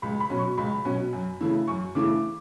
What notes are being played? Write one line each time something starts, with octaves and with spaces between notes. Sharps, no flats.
C#2 B5
B5
B2 F#3 C#4
C#6
C#2 B5
B2 F#3 C#4
F#2
C#3 E3 A3 E4
F#2 C#6
C#3 E3 A3 E4 D6